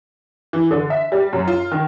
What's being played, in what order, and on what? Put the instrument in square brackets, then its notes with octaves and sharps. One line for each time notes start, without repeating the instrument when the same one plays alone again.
[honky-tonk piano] E3
D3
E5
G3
F#2
F4
D#3